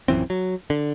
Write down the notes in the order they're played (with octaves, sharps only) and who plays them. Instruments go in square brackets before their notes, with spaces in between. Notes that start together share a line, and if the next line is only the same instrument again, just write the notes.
[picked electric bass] A#1 F#2 E3 C4
F#3
D3